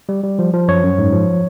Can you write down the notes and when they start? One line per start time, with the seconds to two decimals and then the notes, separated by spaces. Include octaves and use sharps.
0.09 G3
0.24 G3
0.39 F3
0.54 F3
0.68 F#2 C#5
0.84 F#2
0.98 G#2
1.12 F3